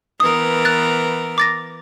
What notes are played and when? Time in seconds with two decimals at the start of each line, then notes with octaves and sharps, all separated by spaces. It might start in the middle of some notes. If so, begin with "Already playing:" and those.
0.20 E3 B3 A#4 D#6
0.65 F#6 A6
1.38 D6 A6 A#6